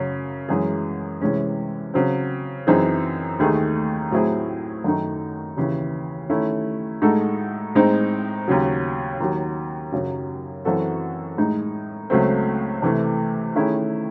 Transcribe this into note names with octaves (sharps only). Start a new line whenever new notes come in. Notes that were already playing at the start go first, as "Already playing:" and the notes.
Already playing: F#2 C#3 F#3 C#4
F#2 E3 G#3 C#4 G#4
C3 E3 G#3 C#4
C#3 F#3 C4
F#2 E3 C4 D#4 G#4
D#2 D#3 A3 D#4 G#4
A2 F#3 C4 E4 G#4
F#2 D#3 A3 D#4
D#2 C#3 E3
D#3 A3 C#4 E4
A2 G#3 D#4 F#4 A4
A2 G#3 C4 D#4
D#2 C#3 F#3
D#2 D#3 F#3
F#2 C#3 F#3
F#2 E3 C4 F#4 A4
A2 G#3 D#4
C#2 C#3 F#3 A3 C4
C3 E3 A3
D#3 A3 C#4 E4 G#4